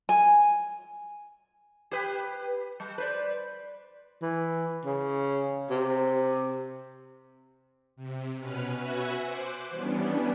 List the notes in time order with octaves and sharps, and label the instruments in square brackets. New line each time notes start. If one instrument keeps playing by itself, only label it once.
[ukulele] G#5
[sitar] G4 B4
G3
B4 C5 D5
[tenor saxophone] E3
C#3
C3
[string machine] C3
B2 C#4 B4 F6
F#4 B4 E5 F#5 G#5
C5 D6 F#6
E3 G3 B3 C#4 D4